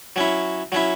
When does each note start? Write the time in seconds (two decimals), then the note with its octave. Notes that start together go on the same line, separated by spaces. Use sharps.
0.16 F#3 C#4 E4
0.72 F#3 C#4 E4